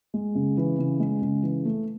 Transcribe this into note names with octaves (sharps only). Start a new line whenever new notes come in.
G#3
C#3
E3
C#3
G#3
C#3
E3
A3